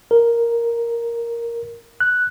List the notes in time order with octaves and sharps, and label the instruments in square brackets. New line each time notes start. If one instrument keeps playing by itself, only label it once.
[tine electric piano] A#4
F#6